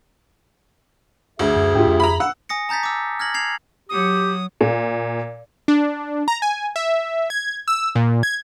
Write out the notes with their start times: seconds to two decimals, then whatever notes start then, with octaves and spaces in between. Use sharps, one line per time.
1.39 D2 G#4 E5
1.56 F#2
1.75 G#2 F4 G4 G5
1.87 F2
2.00 A#5 B5
2.20 F#5 E6
2.49 G#5 D#6 A#6 C#7
2.69 A5 A#5 G6 A6 B6
2.83 D6 E6
3.20 F6 G#6 A#6 F#7
3.34 G#6 C7 F7
3.89 F#3 G4 D#6
4.61 A#2
5.68 D4
6.28 A#5
6.42 G#5
6.76 E5
7.30 G#6
7.68 E6
7.95 A#2
8.23 G#6